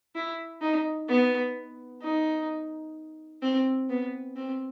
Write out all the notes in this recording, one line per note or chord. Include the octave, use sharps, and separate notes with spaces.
E4
D#4
B3
D#4
C4
B3
C4